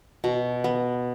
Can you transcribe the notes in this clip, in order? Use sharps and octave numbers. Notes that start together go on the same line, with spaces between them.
B2
B3